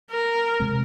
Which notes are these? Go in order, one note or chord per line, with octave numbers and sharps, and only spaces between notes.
A#4
C3 G#3 C4